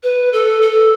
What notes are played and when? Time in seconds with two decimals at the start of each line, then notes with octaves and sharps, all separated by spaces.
0.03 B4
0.33 A4
0.62 A4